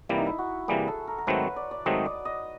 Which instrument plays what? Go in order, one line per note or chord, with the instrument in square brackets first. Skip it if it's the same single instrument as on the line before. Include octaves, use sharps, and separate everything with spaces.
[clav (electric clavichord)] C3 E3 G3 A#3 [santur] E4
[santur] D#4
E4
F#4
[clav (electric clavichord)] C3 E3 G3 A#3 [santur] G#4
[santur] A4
A#4
A#4
[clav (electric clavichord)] G#2 D#3 F#3 A3 C4 [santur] B4
[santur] C#5
D5
D5
[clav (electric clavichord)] G#2 D#3 F#3 A3 C4 [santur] D#5
[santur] D5
D#5